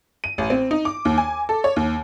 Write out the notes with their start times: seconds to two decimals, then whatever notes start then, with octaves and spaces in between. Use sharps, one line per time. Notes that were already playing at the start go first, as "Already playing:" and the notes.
0.24 D#7
0.38 A1
0.50 C4
0.71 D#4
0.85 D6
1.05 D#2
1.18 G#5
1.49 A4
1.64 C#5
1.76 D#2